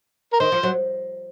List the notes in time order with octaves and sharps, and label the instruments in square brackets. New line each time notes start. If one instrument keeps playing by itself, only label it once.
[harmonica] A#4
[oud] D#3 [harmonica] C5
[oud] F3
F#3